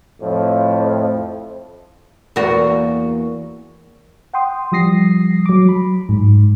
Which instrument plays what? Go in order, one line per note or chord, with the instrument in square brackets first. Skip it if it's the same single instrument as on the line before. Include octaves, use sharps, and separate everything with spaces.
[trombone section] F2 A2 F3
[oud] E2 A#3 F#4
[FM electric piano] F#5 G5 C6 D#6
F3 G3 D#6 A#6 C7
F#3 D6
B5
G#2